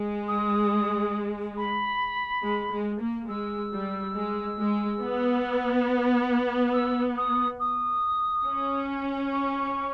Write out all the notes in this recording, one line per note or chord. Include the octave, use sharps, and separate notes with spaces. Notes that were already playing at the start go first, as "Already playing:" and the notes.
Already playing: G#3
D#6
B5
G#3
G#3
A#3
G#3 E6
G3
G#3
G#3
B3
E6
D#6
D#6
C#4
C#6